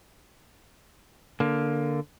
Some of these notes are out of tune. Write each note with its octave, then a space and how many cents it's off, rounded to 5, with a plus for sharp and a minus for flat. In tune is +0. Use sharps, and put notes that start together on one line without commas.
D3 +0 A#3 +10